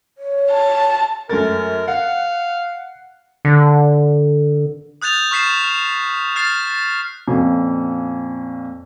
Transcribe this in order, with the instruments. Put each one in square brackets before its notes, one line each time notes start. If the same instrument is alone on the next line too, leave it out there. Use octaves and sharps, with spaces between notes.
[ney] C#5
[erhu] A5
[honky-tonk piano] F#2 A3 A6 [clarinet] A#4
[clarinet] F5 [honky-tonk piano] F#5
[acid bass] D3
[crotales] D#6 F#6 G6 A6 F7
C#6 F6 B6 C7 E7
F6
F6 A6 C7
[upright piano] F2 A#2 C#4